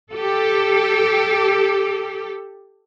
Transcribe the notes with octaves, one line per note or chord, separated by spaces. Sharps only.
G4 A4